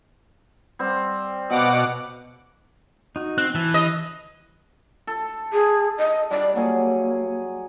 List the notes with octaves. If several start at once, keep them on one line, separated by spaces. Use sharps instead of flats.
G3 C4
B2 D#5 F5 F#5 D6
D#4 F#4
C4 F#6
E3 A5 E6
D#5
A4
G#4
D#5
G3 D5
F#3 A#3 G#4